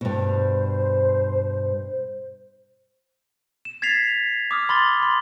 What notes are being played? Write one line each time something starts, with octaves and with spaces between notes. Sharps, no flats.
G2 B2 C5
E7
G#6 A6 B6 C7 F7
D6 D#6 F6
B5 C6 A6 G7
B5 C6